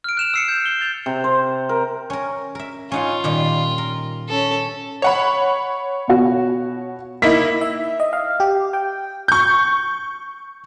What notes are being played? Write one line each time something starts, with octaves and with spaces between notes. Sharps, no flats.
F6 D7
F#6 E7 F7
E6 C7 C#7
G6
G7
G6 A6 F7
C3
C5
A#4
C#4 A#4
A#4 E5
C#4 D#4 F4 F#5
A#2 D#3 G3
A#4
C#4 A4
C#5 F#5 B5
B2 F#4
A#3 D#4 E4 B6
E5
D#5
F5
G4
G5
C#6 G6